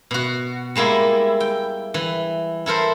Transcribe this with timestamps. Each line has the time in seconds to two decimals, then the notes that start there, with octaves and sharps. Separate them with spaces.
0.11 B2 F#4
0.76 G3 G#3 A#3 E4
1.40 G5
1.94 E3
2.66 E4 A4 A#4 C5